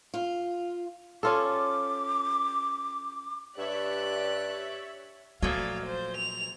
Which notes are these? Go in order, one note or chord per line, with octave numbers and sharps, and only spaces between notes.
F4
C#4 F4 A4 D6
G2 G4 C#5 D5 E5 F#6
A#2 F3 F#3 A3 F5
C5
F7